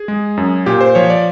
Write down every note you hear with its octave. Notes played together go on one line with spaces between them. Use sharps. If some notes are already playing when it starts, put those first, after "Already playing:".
Already playing: G#4
G#3
F#2
A#2 G4
C5
F3 C#5
D5